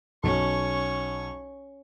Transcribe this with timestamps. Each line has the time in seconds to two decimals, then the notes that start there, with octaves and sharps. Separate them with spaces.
0.23 B1 C#4 C#6